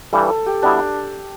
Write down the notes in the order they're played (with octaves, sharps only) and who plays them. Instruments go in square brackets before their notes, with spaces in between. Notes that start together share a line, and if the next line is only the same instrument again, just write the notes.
[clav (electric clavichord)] G2 E3 G3 [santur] A4
[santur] A4
G4
[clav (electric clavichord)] B2 G3 B3 E4 [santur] D4